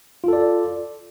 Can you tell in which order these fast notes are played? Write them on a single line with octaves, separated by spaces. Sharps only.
F4 A4 D5